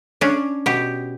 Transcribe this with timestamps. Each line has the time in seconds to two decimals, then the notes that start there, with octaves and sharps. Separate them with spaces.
0.21 C#4 D4
0.66 B2 G4